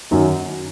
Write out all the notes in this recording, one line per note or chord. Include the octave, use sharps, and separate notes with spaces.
F#2 D#3 F#3